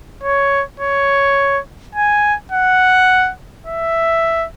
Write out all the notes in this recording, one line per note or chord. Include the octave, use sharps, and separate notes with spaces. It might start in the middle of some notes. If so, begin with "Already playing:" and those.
C#5
C#5
G#5
F#5
E5